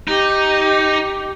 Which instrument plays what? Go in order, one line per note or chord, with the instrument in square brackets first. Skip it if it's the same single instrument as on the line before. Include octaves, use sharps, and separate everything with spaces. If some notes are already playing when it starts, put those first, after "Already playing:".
[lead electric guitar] D#4 [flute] G4